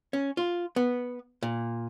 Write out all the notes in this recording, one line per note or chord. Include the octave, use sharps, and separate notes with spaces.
C#4
F4
B3
A#2